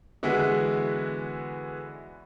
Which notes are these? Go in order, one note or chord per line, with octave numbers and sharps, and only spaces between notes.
D3 E3 G#3 B3 E4 F#4